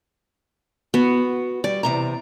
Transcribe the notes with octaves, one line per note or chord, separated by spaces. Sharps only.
B3 F#4
G3 D5
E2 C3 A#5